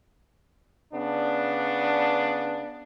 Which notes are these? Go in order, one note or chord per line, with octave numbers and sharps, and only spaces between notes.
C#3 B3 D4